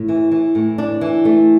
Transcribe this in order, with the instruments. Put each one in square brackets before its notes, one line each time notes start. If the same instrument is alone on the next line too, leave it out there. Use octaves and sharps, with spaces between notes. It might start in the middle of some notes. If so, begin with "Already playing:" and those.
Already playing: [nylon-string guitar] A2
E3
E3
A2
D4
E3
A3